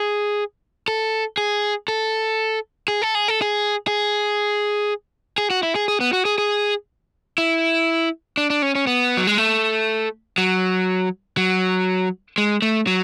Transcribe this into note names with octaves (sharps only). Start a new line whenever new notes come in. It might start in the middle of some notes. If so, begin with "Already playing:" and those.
Already playing: G#4
A4
G#4
A4
G#4
A4
G#4
A4
G#4
G#4
G#4
F#4
E4
G#4
G#4
B3
F#4
G#4
G#4
E4
D4
D4
C#4
C#4
B3
F#3
G#3
A3
F#3
F#3
G#3
A3
F#3